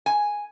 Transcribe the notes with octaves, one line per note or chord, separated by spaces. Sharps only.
G#5